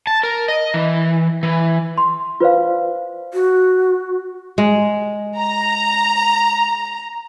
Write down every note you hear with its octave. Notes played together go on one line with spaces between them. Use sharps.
A5
A#4
D#5
E3
E3
C6
F4 B4 C5 D5 F5
F#4
G#3
A#5